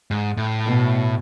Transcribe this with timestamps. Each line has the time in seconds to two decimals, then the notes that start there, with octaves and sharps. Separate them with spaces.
0.11 G#2
0.37 A2
0.66 B2